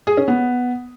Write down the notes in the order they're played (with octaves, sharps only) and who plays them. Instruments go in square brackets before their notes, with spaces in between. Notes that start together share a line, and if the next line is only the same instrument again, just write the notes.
[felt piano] G#4
C#4
B3